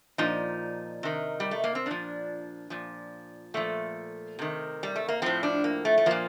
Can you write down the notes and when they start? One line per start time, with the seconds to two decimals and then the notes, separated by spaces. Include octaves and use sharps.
0.18 A#2 F3 D#4
1.03 C3 D#3
1.40 G3
1.51 A3
1.64 A#3
1.75 C4
1.86 A#2 F3 D4
2.70 A#2 F3
3.54 A#2 F3 A3
4.39 C3 D#3
4.83 G3
4.96 A3
5.08 A#3
5.22 A2 F3 C4
5.43 D4
5.64 A#3
5.85 A3
5.98 A3
6.06 A#2 F3 A#3